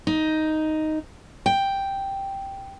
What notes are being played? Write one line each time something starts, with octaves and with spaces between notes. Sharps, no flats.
D#4
G5